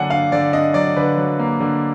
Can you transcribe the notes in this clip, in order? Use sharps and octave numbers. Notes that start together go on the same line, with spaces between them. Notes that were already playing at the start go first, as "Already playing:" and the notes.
Already playing: D3 F#3 A#3 D4 F#5 G#5
D4 F5
D3 D5
D4 D#5
F#3 D5
D3 B4
F#3
A#3
D3